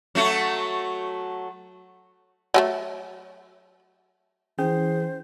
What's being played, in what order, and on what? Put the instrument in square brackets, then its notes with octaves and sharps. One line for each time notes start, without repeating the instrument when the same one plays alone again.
[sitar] F#3 A3 F#4
[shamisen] F#3 G#3 A3
[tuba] E3 [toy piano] C#4 [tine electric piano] G#4 [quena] C5